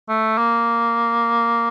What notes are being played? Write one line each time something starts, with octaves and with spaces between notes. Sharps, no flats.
A3
A#3